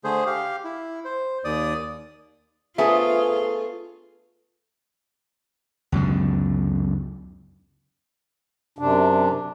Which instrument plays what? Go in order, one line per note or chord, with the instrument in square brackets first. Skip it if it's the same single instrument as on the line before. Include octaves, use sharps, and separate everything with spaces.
[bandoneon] D3 A3 G#4 C5
G4 F5
E4
C5
D#2 D5 D#6
[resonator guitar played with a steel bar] A3 G#4 [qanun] B3 D4 C5 [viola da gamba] F4 [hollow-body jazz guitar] E5
[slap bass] C#2 F#2 B2 D3
[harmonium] F#2 C3 D4